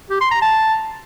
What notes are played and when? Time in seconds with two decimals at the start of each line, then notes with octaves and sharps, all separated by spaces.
0.10 G4
0.21 C6
0.31 A#5
0.42 A5